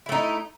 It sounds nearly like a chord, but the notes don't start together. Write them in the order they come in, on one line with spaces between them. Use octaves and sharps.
E4 A3 D#4